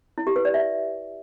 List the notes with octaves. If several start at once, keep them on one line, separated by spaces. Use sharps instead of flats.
E4
G4
B4
D5
E5